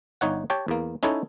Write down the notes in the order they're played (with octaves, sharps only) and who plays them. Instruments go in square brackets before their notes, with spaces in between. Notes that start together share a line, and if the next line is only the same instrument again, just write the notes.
[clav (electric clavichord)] G1 D#4 C#5 F#5
G4 C#5 G5 A5
E2 A#3
C#4 D#4 E4 A4 C#5